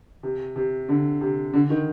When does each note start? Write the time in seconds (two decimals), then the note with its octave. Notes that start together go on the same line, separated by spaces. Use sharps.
0.23 C3
0.56 C3
0.89 D3
1.21 C3
1.54 D3
1.70 D#3